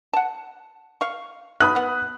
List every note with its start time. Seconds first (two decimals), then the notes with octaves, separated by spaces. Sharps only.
0.13 F#5 A5
1.01 F5 C#6
1.60 B2 B5 D#6 F#6
1.75 B3 F#5